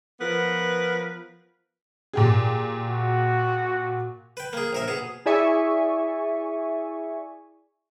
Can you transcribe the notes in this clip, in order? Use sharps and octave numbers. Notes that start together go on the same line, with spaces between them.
F3 B3 A#4 B4
A#2 G4 G#4
F#4
B4 G5
A#3 G#4
A#1 A#4 E5
B2 G#4
E4 G#4 D5 E5 G#5 C#6